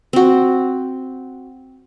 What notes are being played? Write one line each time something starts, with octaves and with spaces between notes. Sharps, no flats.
C4 F#4